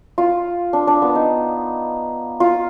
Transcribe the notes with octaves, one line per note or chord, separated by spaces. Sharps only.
F4
D4
D4
B3
D#4
F4